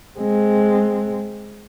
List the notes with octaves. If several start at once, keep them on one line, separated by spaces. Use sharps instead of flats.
G#3 C4